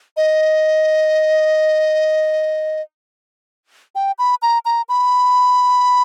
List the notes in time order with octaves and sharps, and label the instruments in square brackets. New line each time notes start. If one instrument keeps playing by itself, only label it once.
[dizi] D#5
G5
B5
A#5
A#5
B5